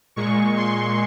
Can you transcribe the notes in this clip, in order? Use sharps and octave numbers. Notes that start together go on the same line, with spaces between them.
A#2 G#3 C#6
C6